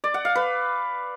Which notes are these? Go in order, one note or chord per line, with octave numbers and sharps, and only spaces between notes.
D5
F#5
F5
B4